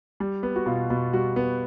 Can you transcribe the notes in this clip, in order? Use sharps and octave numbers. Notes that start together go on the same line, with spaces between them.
G3
B3
F#4
B2 F4
B2
G3 F#4
B3